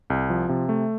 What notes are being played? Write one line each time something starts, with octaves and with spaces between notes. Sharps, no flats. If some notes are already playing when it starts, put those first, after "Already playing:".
C2
F3
C3
A3